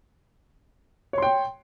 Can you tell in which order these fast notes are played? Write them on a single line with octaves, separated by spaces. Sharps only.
C#5 C6 G5